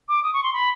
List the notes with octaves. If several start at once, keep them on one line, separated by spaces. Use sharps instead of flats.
D6
D#6
C#6
C6
B5